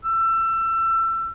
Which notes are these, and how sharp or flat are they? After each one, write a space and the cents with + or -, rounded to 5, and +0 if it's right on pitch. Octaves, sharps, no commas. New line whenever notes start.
E6 +25